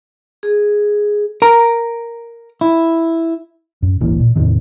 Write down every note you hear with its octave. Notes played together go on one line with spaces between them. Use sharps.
G#4
A#4 A#5
E4
F#2
D1 G1 E3 A#3
A#2
E2 A2 C3 D#3